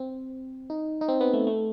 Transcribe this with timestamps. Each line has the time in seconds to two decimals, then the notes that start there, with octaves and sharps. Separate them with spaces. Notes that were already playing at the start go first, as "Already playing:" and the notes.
Already playing: C4
0.70 D#4
1.01 D#4
1.08 C4
1.21 B3
1.33 A3
1.47 A3